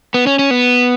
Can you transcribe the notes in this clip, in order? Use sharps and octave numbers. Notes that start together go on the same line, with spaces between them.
B3
C#4
C#4
B3